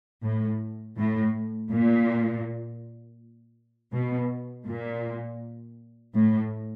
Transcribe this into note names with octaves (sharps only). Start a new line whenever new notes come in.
A2
A2
A#2
B2
A#2
A2